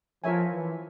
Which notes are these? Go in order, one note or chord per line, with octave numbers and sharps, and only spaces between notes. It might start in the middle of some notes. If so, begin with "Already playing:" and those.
F3 F4 A#4 C#5 E5 G#5
E3